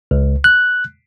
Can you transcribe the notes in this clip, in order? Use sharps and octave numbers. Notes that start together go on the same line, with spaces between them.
C#2
F#6